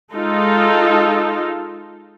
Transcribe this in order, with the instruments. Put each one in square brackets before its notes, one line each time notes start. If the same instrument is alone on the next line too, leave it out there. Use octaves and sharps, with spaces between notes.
[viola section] G#3 D#4 F4 A4